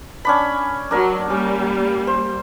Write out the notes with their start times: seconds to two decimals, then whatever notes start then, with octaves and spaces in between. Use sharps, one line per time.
0.25 C#4 D4 B5
0.91 F#3 D4 A#4
1.30 G3 A#3 C#4
2.07 C5